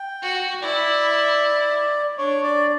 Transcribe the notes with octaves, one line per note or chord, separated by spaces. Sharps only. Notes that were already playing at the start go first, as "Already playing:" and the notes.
Already playing: G5
F#4
E4 D5
D4 C#5
D5